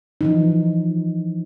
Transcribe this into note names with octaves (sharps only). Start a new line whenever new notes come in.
E3 F3 D#4